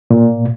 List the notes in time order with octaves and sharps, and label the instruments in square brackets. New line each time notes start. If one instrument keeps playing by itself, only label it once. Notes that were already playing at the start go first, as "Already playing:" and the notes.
[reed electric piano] A#2